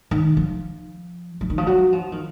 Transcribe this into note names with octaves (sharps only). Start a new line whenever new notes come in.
D#3
F3
F3
D#3
F3
F#3
F3
D#3